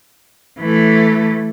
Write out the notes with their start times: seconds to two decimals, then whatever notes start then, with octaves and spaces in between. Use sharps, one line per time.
0.60 E3 A3